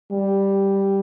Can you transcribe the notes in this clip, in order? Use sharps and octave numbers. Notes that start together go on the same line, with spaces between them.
G3